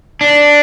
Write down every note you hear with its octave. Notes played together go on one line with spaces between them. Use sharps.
D4